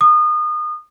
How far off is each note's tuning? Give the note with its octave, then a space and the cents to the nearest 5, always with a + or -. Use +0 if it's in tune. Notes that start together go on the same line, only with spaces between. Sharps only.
D#6 -30